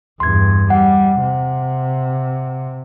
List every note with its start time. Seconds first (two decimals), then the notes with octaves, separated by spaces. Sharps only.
0.20 E2 G2 C6 G#6
0.70 G3 F#5
1.20 C3